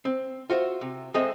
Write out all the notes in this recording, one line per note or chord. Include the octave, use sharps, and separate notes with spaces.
C4
F4 F#4 C5 E5
C3
F3 G#3 C4 A4 D#5 E5